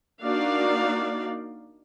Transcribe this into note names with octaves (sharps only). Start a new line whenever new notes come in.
A#3 D4 D#4 F#4 D5 F5